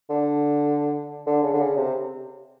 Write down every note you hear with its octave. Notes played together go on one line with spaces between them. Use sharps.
D3
D3
C#3
D3
C#3
C3